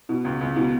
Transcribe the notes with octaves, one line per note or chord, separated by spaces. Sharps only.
B2
C#2
C#2
B2